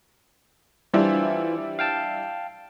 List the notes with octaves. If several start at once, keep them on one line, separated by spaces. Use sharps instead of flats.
E3 G3 D4 E4 F4 C5
F5 G5 A5